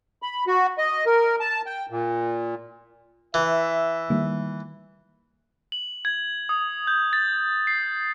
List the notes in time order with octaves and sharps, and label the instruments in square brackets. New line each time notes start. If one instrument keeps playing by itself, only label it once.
[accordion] B5
F#4
D#5
A#4
A5
G5
A#2
[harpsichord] E3 [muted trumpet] E5
[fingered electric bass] D#3 G3 A#3
[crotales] F#7
G#6
D#6
G6
A6
C7